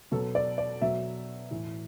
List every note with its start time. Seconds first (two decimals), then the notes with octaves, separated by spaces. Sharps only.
0.11 B2 F#3 A4
0.35 D5
0.58 D5
0.81 B2 F#3 E5
1.51 A2 E3